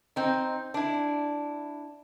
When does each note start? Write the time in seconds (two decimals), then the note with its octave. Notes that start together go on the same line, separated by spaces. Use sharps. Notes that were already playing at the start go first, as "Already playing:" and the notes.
0.16 C4 D#4
0.74 D4 E4